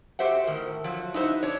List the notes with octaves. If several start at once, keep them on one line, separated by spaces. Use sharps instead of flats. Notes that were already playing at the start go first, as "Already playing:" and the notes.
F#4 G4 C5 E5 F#5
A2 D#3 A#4
F3 F#3
D#4 E4 F#4 C5
D4 C#5